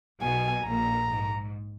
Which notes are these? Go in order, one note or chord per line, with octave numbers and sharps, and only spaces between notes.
B1 B2 G#5
A#1 A#2 A#5
G#2